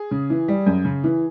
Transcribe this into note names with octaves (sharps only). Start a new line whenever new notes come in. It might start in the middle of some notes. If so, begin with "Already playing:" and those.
Already playing: G#4
C#3
E3
G3
F#2
C#3
E3